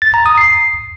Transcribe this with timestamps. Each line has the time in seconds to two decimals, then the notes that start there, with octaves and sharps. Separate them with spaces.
0.02 A6
0.14 A#5
0.26 D#6
0.38 C7